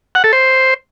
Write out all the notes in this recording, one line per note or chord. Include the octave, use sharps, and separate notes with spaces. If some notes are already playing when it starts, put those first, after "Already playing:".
F#5
A4
C5